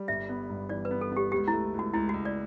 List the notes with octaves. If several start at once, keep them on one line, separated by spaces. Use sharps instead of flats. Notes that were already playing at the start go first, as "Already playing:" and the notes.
Already playing: G3
G1 E5
B3
G2
E3 D5
B4
B3
A4
B3 G4
C#2 G4
A3 E4
C#2
F#4
C#2 E4
C#2 F#4
D5